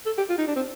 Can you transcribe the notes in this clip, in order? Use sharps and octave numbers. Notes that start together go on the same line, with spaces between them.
A4
G4
F4
D#4
D4
C4